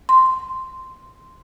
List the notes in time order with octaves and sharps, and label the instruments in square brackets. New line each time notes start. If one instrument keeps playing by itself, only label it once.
[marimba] C6